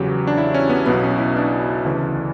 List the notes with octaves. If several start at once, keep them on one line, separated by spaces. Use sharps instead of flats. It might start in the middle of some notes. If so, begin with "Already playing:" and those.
Already playing: E2 C#3 F#3 G4
D4
E4
C#4
B3
B1 B2 F#3 B3
C#4
E4
D4
D2 C#3 E3